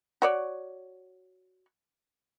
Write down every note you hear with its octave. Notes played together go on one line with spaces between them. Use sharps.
F#4 C#5 D5